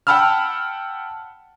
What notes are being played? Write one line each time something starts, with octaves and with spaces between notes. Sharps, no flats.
F#5 G5 A5 B5 E6 F6